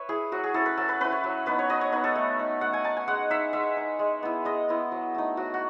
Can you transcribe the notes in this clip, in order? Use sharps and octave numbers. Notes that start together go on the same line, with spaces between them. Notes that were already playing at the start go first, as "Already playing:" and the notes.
Already playing: B4 C#5 E5
E4 G#4
F#3 F#4
G#4
C#4 E4 A4
B4
F#3 A4
B4
C#4 E4 B4
C#5
F#3
B3 D#4 B4
C#5
F#3 D#5
C#5
B3 D#4 B4
A4
A3
D#4
A3 F#5
G#5
D#4 A5
G#5
G#3 F#5
D#4 E5
G#3 E5
D#4
G#3
B3 E4
G#3 D#5
B3 E4
F#3
A3 D#4
F#3 F#4
F#4